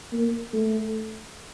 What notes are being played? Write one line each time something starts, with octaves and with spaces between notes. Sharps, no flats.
A#3
A3